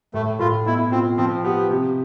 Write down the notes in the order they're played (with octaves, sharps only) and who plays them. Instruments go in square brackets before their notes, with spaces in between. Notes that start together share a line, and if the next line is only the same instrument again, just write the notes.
[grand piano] A2 [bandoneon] A3
[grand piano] A2 [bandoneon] F4
[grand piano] B2 [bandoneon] E4
[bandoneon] C4 [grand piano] F4
[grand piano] F3 [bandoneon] C4
[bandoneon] B3 [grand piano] G4
[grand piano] C3